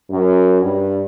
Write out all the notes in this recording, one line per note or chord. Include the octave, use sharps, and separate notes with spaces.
F#2
G2